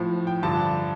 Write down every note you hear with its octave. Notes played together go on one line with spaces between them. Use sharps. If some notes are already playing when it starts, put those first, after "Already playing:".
Already playing: A2 F3
G5
G2 D3 F3 A5